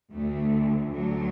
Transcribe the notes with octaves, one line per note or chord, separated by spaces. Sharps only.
D2 D3 A3
D2 D3 F#3